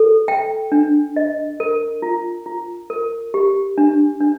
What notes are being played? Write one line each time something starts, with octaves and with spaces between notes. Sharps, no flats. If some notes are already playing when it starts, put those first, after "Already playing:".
Already playing: A4
G5
D4
D#5
A#4
F4
F4
A#4
G4
D4
D4